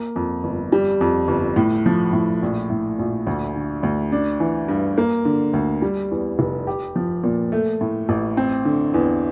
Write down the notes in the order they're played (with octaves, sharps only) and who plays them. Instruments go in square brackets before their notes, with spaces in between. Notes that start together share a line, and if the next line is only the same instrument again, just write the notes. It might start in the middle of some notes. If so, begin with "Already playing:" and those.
Already playing: [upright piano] A#3
F2
G1
G3
F2
G1
A2
F3
A2
A#1
A2
A#1
D2
D3
D2
D4
E3
G2
A#3
D3
D2
G3
E2
F1
G4
F3
A#2
A3
A2
A1
C4
D3
E2